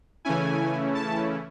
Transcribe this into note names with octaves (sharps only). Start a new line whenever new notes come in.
C#3 E3 A3 C#4 E4 G#5
A5